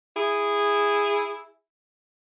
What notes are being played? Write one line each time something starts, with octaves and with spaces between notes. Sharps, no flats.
E4 G#4